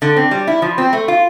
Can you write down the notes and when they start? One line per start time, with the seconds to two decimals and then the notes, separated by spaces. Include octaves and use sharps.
0.02 D3
0.17 C4
0.31 G3
0.47 E4
0.62 F3
0.78 C4
0.93 A3
1.08 F4